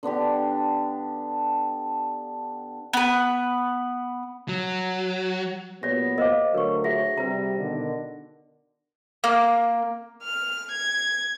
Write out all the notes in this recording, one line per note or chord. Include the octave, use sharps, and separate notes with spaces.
D3 B3 D4 G4
B3 B4
F#3
A#2 F#3 B3 G4 C#5 D5 A#6
A#4 C5 D#5 F5 D6
D2 F#3 A#4 B4 C#6
F#4 G#4 E5 A#6
C3 G3 B4 A#5
B2 D3 D#3
A#3
F6
G#6